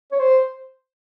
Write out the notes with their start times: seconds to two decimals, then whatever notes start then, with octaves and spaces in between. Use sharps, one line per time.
0.12 C#5
0.20 C5